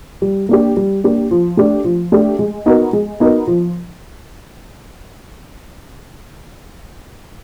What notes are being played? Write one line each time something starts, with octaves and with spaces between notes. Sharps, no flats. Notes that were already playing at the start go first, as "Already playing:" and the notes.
G3
A#3 D4 G4
G3
A#3 D4 G4
F3
A3 D4 G4
F3
A3 D4 G4
G#3
B3 D#4 F#4 A#4
G#3
B3 D#4 F#4 A#4
F3